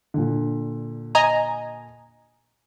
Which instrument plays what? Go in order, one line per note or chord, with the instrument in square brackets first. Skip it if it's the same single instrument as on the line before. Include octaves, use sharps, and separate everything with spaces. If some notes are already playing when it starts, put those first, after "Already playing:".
[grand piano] A#2 D3
[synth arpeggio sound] D#5 G#5 A#5